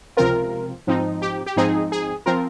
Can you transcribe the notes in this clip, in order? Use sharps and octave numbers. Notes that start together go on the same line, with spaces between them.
C#2 C3 F3 C4 F4 A#4
G#2 F3 C4 D#4
G4
G4
G#2 F3 C4 D#4 G#4
G#4
F3 C4 F4 A#4